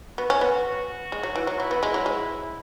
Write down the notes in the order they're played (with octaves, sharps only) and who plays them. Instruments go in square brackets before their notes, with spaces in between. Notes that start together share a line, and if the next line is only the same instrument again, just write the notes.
[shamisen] B3 [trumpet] F#4
[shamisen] C#4
B3
[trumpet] F#4
[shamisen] G#3
F#3
E3
F#3
[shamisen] F#3 [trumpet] E4
[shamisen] B3
G#3
F#3
G#3